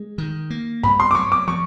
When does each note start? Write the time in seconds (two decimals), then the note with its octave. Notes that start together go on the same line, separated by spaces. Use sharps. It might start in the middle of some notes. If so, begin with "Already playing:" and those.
Already playing: G#3
0.18 D#3
0.50 A#3
0.83 G2 B5
1.00 C6
1.11 D6
1.15 F#3 C#6
1.32 D6
1.48 F3 C#6